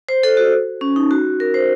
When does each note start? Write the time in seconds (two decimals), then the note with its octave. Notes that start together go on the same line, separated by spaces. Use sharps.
0.09 C5
0.23 A4
0.37 F#4
0.81 C#4
0.96 D#4
1.11 F#4
1.40 A#4
1.54 C5